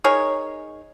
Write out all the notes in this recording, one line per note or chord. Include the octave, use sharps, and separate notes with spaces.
D#4 G#4 A#4 C#5